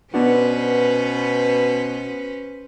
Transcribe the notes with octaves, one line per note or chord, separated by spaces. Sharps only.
B2 B3 C#4 D4 F#4 B4 C5